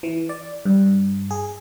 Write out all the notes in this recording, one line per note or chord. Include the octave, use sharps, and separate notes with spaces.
E3
D5
G2
G#4